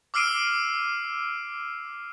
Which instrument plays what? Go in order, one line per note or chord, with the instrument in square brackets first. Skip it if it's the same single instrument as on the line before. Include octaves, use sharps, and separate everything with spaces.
[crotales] D6 E6 F6 C7 D7 D#7